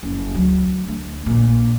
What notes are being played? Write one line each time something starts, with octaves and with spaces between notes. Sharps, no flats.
F#1 F2
D2 F#3
D2
A#1 A#2